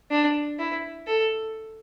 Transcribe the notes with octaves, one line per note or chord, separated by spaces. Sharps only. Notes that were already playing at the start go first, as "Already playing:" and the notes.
D4
E4
A4